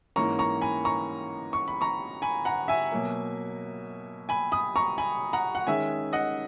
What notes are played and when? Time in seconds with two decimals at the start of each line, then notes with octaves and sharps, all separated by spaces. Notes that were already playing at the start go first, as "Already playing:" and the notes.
0.16 G#2 E3 A#3 C#4 A#5 C#6
0.39 A#5 C#6
0.61 G#5 B5
0.85 A#5 C#6
1.53 C#6
1.68 B5
1.81 A#5 C#6
2.22 G#5 B5
2.45 F#5 A#5
2.68 E5 G#5
2.92 B2 F#3 A#3
4.29 G#5 B5
4.52 B5 D#6
4.76 A#5 C#6
4.98 G#5 B5
5.33 F#5 A#5
5.55 F#5
5.67 D#3 G#3 C#4 E5 G#5
6.13 D#5 F#5